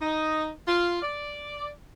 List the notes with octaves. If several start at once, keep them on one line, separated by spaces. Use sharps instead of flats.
D#4
F4
D5